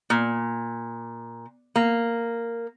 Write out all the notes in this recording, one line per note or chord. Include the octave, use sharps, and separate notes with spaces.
A#2
A#3